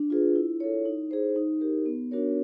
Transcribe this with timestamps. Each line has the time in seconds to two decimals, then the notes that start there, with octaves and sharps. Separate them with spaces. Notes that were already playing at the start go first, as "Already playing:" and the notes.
Already playing: D4
0.10 F4 G#4 B4
0.35 E4
0.60 A4 C#5
0.85 D#4
1.11 G#4 C5
1.36 D#4
1.61 G4 A#4
1.86 B3
2.11 D4 F#4 A#4 C#5